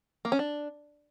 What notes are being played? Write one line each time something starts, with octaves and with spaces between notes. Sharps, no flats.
A#3
C#4
D4